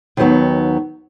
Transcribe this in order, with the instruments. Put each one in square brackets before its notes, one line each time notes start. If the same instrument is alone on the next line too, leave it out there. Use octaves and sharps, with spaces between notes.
[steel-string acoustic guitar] D#2 D#3 F#3 B3